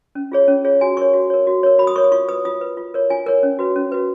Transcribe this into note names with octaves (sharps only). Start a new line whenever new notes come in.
C#4
F4 G#4 C#5
C#4
F4 G#4 C#5
F#4 G#5
A#4 C#5 C#6
F#4
A#4 C#5
F#4
A#4 C#5
F#4 B5
D#6
A#4 C#5 C#6
D#6
F4 C#6
B4 D#6
F4 D#6
B4
F4
A#4 C#5
F4 G#5
A#4 C#5
C#4
F#4 B4
C#4
F#4 B4